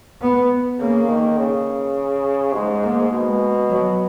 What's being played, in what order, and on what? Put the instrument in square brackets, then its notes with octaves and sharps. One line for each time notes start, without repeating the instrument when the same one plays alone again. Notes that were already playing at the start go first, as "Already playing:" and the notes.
[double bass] B3
[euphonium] C#3 [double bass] A#3
[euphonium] D#3
C#3
[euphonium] G#2 [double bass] G#3
[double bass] A#3
[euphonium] B2 [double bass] G#3
[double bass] F#3